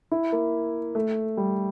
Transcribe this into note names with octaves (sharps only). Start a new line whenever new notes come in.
E4
A#3
A3
G3